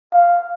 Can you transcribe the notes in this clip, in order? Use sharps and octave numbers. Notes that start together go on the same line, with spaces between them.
F5